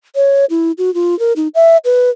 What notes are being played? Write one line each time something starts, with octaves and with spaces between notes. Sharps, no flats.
C#5
E4
F#4
F4
A#4
D#4
E5
B4